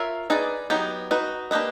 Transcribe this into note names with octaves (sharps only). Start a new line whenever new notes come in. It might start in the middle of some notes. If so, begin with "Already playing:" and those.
Already playing: F4 A#4 C#5 E5
D#4 G#4 B4 D5
F#3 B3 D#4 G4
D#4 F#4 B4
A#3 D4 G4 B4 D#5